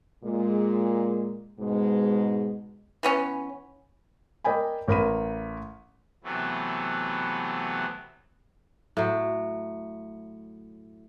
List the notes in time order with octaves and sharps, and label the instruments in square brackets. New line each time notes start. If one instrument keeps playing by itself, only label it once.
[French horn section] A#2 G#3
G#2 B2 G#3
[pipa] E3 B3 C#4
[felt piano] A#4 D5 D#5 G5 G#5 B5
A1 A#4 B5 D#7
[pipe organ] C3 E3 F#3 A3 B3
[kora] A2 F#3